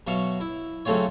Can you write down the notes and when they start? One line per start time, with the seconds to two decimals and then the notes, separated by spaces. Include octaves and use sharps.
0.07 B2 F#3 E5 F5 C#6
0.40 E4
0.85 C#3 F#3 A3 C4 F4 C#5